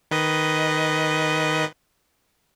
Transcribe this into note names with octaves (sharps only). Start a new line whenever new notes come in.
D#3 B4 D#5